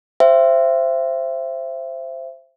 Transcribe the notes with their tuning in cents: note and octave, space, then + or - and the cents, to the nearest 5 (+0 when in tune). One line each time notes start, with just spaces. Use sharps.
C5 +0 E5 +25 G5 -40